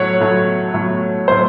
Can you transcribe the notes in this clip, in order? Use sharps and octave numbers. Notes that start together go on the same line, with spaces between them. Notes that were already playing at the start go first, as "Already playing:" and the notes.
Already playing: A2 F#3 A3 C#5 F#5
A2 F#3 A3
A2 F#3 A3
A2 F#3 A3 C5